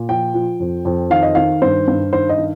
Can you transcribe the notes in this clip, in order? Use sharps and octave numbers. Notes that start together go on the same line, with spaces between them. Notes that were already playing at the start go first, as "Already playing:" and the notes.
Already playing: A#2
F3 G5
F3
F2
F2
D#3 F5
D#5
D#3 F5
G2 C5
G2
D#3 C5
D#5
D#3